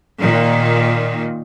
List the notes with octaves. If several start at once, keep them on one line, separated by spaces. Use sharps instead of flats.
A#2 D#3